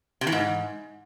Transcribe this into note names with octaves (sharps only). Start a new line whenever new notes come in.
C3
E3
G#2